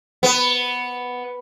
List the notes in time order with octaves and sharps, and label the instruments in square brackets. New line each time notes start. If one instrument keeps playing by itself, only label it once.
[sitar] B3